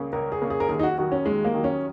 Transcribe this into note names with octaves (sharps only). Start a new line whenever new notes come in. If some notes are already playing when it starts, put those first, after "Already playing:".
Already playing: C#2 C#3 A#3 C#4
C#2 A#4
G#4
C#3 A#3 C#4
G#4
A#4
D#2 G#4
D#4
F#4
D#3 F#3 F#4
C#4
D#2 G#3
A#3
D#3 F#3
C#4